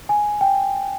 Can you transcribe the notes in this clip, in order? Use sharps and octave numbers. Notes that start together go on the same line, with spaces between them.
G#5
G5